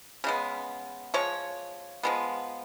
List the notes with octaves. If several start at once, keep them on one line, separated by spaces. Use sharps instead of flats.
C#3 G#3 B3
F3 G#3 C#5
F3 G#3 B3